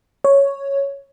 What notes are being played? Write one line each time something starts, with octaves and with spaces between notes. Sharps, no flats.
C#5